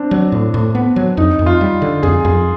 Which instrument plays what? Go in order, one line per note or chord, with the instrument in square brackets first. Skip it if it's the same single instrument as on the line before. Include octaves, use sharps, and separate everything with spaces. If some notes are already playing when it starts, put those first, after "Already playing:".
Already playing: [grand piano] C4 D4
[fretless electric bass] F#3
A2
A2
B3
F#3
[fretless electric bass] F2 [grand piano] D#4
[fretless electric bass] F2
[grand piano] F4
[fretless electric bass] G3
D3
[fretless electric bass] F2 [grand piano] G#4
[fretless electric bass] F2